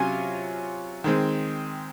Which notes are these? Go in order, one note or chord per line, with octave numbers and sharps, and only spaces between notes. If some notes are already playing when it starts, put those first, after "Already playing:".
Already playing: C3 F#3 C#4 F4 G#5
D#3 G#3 C4